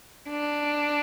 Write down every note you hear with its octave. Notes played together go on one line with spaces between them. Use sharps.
D4